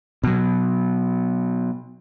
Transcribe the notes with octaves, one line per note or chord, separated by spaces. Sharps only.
B2 F#3